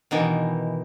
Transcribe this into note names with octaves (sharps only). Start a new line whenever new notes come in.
B2 D#3 E3